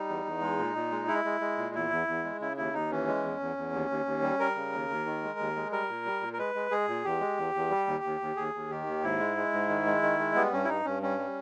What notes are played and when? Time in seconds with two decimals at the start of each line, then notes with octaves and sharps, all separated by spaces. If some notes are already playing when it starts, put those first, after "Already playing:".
Already playing: G3 D#4
0.08 E2
0.25 E2
0.41 G#3
0.58 A#2
0.75 A#2
0.91 G#3
1.07 G#3 E4
1.25 G#3
1.41 G#3
1.57 A#2
1.75 E2 E4
1.90 E2
2.08 E2
2.24 G#3
2.40 C#3 E4
2.57 D#2 E4
2.73 D#2 D#4
2.91 E3 C#4
3.07 G#3
3.23 E2
3.40 E2
3.57 E2
3.73 D#2
3.90 D#2
4.06 D#2
4.22 G3
4.39 G3 A#4
4.56 C#3
4.73 D#2
4.90 D#2
5.06 D#3
5.23 G#3
5.39 D#2
5.56 G#3
5.72 G3 A#4
5.89 A#2
6.06 G3
6.21 A#2
6.33 A#4
6.38 G#3 B4
6.55 G#3
6.71 G#3 G#4
6.88 A#2
7.04 E2 G4
7.21 G#3
7.37 E2
7.55 E2
7.70 G3
7.87 D#2
8.04 D#2
8.21 D#2
8.36 D#2 G#4
8.54 D#2
8.70 D#3 G4
8.87 D#2
9.03 G#2 E4
9.19 G#3
9.37 G#3
9.53 G#2
9.69 D#3
9.86 G#3
10.02 D#3
10.19 G#3
10.35 G3 B3
10.52 G2 C#4
10.64 E4
10.68 G2 D#4
10.85 G2 C#4
11.02 G3 C#4
11.19 G3